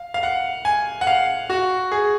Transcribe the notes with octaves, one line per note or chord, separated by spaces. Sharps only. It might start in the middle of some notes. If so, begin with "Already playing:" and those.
Already playing: F5
F5
F#5
G#5
F#5
F5
F#4
G#4